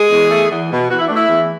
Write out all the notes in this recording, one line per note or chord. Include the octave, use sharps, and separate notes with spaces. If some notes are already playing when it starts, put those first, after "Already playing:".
Already playing: G#3 G#4
E2
A3
E2
B2
E2 F#4
E4
A3 D4
E4
E2